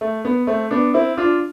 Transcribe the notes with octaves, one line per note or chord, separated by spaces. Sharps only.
A3
B3
A3 C4
B3 D4
C4 E4
D4 F4